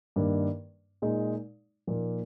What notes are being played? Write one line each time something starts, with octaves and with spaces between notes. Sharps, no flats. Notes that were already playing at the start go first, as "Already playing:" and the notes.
G2 D#3 A#3 D4
A#2 G#3 D#4
A#2 F3 A#3 D#4